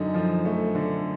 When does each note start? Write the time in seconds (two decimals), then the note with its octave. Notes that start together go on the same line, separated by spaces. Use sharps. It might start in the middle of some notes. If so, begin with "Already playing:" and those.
Already playing: F#2 D3 D#4
0.14 F3
0.45 A3
0.75 D3